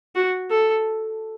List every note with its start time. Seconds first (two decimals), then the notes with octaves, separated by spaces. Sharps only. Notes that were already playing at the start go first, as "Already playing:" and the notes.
0.15 F#4
0.51 A4